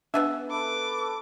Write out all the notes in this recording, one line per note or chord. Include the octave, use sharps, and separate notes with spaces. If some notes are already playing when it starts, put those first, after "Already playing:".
C#3 B3 D4 E5
A4 B4 D6